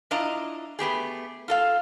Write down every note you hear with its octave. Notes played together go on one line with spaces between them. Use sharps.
D4 E4 F4 D#5 A#5
A3 B3 G4 G#4
F4 A4 F5